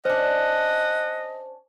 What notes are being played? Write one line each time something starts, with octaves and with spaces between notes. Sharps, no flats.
C#4 D4 C5 D#5 F#5